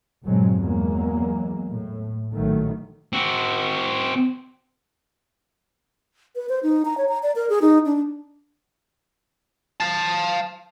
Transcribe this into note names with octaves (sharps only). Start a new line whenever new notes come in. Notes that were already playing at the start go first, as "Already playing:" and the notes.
G1 A#2 F3 F#3 G#3 C4
E2 F#3 G#3 A#3
A2
A#1 D#3 F#3 A3
C4 F#4
B4
C5
D#4
A#5
C#5
A#5
D5
A#4
G#4
D#4
D4
F5 A5